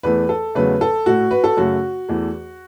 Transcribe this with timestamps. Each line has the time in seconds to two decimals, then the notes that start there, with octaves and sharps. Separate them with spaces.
0.03 E2 E3 A3 B4
0.29 A4
0.55 E2 C#3 F#3 A3 B4
0.81 A4
1.06 A2 A3 F#4
1.31 B4
1.44 A4
1.57 F#2 C#3 A3 F#4
2.09 E2 E3 A3